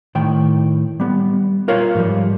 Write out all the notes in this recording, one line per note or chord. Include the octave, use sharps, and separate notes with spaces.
A2 D#3 G5
G3 B3
F4 A#4 C#5 F5
G#2 F3 G3